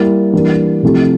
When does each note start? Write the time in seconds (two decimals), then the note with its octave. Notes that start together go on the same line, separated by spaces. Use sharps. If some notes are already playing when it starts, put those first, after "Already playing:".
Already playing: G3 A#3 E4
0.33 E3 G3 A#3 D4
0.83 C3 F3 A3 E4 G4